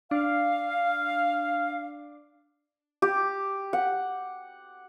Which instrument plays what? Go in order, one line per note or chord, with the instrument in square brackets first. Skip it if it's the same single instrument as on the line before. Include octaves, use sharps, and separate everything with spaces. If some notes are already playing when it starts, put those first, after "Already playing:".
[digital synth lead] D4 [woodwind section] F5
[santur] G4
F#5